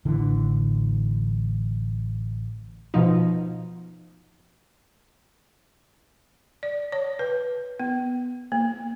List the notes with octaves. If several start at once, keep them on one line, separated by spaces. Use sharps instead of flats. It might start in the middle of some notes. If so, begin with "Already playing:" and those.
A1 D3 E3
B2 F3 D#4
D5
C#5
B4
B3
A#3